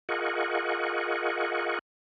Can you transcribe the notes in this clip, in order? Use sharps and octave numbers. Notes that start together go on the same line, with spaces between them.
F4 G#4 A#4 D#5 F#5 C#6